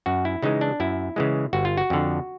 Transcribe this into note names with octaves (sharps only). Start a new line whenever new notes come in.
F#2 F#4
E4
C#3 E3 G#3 D#4
D4
F#2 E4
C#3 E3 G#3
G1 F#4
F4
F#4
F2 D3